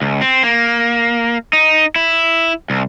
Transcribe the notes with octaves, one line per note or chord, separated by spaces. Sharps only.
C#2
C4
A#3
D#4
E4
C2